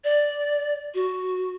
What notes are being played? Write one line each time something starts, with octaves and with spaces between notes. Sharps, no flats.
D5
F#4